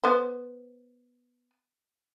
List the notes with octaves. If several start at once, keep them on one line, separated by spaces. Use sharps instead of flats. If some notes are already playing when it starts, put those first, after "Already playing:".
B3 C5